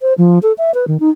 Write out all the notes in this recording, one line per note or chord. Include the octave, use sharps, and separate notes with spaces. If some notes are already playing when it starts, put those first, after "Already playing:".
C5
F3
A4
E5
B4
D#3
D#4